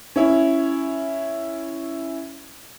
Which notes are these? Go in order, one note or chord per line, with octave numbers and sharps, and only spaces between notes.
C#4 E4